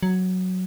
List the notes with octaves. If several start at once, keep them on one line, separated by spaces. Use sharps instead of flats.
F#3